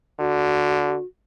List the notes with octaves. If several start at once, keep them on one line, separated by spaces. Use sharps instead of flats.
D3 F#4